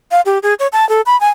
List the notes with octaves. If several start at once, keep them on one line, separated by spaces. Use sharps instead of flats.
F5
G4
G#4
C#5
A5
A4
B5
G#5